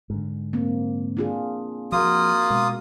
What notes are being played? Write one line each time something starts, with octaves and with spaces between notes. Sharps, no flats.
G#2 D3
A#3 C4
D4 F4 G#4
F3 A#3 F4 F#4 D#6
B2 G#3